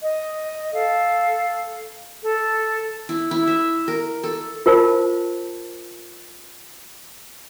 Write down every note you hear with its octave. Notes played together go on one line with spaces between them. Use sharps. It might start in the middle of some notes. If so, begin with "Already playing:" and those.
D#5
A4 F5
A4
E4
E4
E5
A#4
A4
F4 A#4 C5 A5